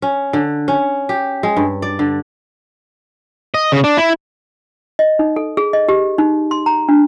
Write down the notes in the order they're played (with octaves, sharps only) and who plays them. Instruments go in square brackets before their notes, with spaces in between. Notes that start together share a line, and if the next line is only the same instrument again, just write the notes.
[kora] C#4
D3
C#4
G4
G#3
G2
D5
D3
[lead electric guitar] D#5
C#3
D4
E4
[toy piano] D#5
D#4
A4
G#4
D#5
G4
D#4
C6
A#5
D4